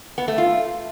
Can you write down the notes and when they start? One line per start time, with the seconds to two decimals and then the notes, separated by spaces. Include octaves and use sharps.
0.18 B3
0.28 A3
0.38 F4